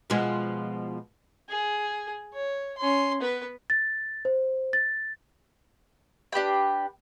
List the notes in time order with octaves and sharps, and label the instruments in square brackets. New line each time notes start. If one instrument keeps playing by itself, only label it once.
[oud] B2 F3 G#3
[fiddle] G#4
C#5
C#4 C6
B3 B4
[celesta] A6
C5
A6
[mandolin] D4 G4 B4 G5